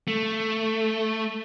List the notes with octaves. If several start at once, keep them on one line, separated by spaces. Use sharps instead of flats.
A3